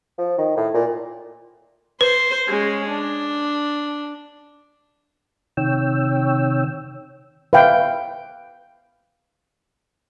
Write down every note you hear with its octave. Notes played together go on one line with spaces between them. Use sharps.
F3
D#3
A2
A#2
B4 C5
G#3 C#4
D4
C3 D#3 C#5 G5 E6
B4 E5 F5 G5